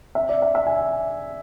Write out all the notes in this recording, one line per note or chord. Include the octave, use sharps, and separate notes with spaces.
E5
D5
E5
E5
G#5